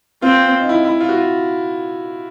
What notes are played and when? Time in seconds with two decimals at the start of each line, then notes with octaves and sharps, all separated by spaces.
0.22 C4 F4
0.60 D#4
0.69 E4
0.85 E4
1.00 F4
1.09 F#4
1.17 F4